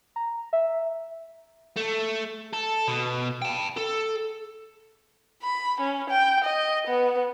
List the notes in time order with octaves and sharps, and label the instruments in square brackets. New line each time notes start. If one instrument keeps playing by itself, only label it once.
[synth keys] A#5
E5
[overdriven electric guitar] A3
A4
B2
G5 A5
A4
[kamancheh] B5
C#4
G5
D#5
B3